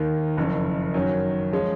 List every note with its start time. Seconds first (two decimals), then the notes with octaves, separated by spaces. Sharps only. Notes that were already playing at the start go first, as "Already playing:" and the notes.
Already playing: D#2 D#3 A#3
0.37 F#1 F2 C#3
0.94 F#2 D#3 F#3 C#4
1.52 F3 G#3 C#4